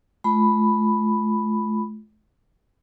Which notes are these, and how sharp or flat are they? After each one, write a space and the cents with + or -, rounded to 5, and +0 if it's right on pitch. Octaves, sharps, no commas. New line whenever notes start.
A3 -40 F4 -10 B5 +0